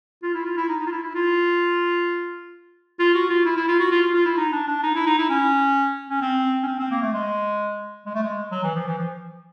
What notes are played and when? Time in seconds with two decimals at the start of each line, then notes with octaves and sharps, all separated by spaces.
0.22 F4
0.34 E4
0.45 F4
0.57 E4
0.69 D#4
0.80 D#4
0.87 F4
0.92 E4
1.03 E4
1.15 F4
2.99 F4
3.14 F#4
3.29 F4
3.45 E4
3.57 E4
3.68 F4
3.80 F#4
3.91 F4
4.02 F4
4.14 F4
4.25 E4
4.37 D#4
4.52 D4
4.68 D4
4.83 D#4
4.95 E4
5.06 D#4
5.18 E4
5.29 C#4
6.09 C#4
6.21 C4
6.63 C#4
6.67 C4
6.79 C4
6.91 A#3
7.02 A3
7.13 G#3
8.06 G#3
8.14 A3
8.23 G#3
8.51 F#3
8.63 E3
8.75 F3
8.86 E3
8.98 F3